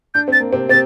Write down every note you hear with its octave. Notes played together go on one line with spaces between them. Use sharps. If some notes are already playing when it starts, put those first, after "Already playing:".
D4 G6
C4 A6
A#3
C3 C4
C3 C4 A6